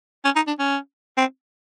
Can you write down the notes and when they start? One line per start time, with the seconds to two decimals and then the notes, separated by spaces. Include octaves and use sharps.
0.25 C#4
0.36 D#4
0.47 D4
0.59 C#4
1.17 C4